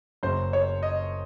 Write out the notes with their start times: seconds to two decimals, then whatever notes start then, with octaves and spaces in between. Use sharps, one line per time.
0.23 F#1 F#2 C#3 F#3 C5
0.53 C#5
0.83 D#5